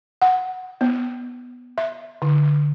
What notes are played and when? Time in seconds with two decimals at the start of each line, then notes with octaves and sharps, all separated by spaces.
0.22 F#5
0.81 B3
1.78 E5
2.22 D3